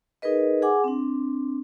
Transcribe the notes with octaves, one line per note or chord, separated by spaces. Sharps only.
D#4 G#4 A#4 B4 D#5
G#4 F#5 G#5 D6
C4 D4